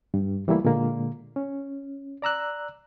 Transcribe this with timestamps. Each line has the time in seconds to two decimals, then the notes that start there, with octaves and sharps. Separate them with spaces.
0.14 G2
0.47 C#2 E3 G3 A3 A#3 E4
0.64 A#2 D3 G#3 A#3
1.36 C#4
2.22 D5 A#5 E6 F#6